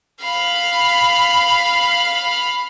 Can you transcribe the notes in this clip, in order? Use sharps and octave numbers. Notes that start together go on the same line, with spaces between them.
F5 B5